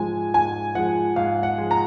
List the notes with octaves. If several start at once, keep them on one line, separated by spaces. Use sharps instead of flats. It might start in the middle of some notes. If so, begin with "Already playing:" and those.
Already playing: G#2 F3 G#3 G#5
G#2 G#5
F3 G#3 F#5
G#2 F5
F#5
F3 G#3
A#5